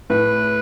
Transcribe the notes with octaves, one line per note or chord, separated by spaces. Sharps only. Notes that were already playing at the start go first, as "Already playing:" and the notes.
A2 B4